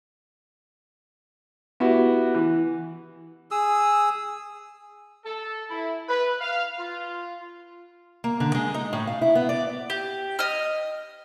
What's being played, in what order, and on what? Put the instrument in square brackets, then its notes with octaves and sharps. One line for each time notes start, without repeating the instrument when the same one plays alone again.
[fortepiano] B3 E4 F#4 G4
E3
[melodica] G#4 D#6 E6
[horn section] A4
E4
B4
F5
F4
[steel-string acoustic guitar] A#3
D3
G#3
D#4
A2
F5
E4
B3
D5
[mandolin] G4
D#5 F6